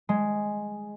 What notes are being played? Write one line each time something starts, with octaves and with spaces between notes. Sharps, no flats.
G#3